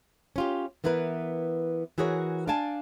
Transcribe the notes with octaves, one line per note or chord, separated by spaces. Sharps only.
C#4 F4 G4
E3 B3 E4 A#4 B4
E3 F#4 G#4 A#4 C#5
D4 D5 F5 G#5 A5